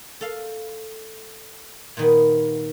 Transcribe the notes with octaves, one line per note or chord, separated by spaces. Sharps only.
A4 F5
A#2 D#3 B3